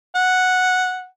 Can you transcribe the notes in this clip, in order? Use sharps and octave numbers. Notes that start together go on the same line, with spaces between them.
F#5